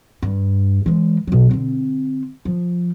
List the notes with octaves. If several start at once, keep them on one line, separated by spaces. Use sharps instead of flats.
G2
E3 G#3
B2 F#3
D3 C4
F3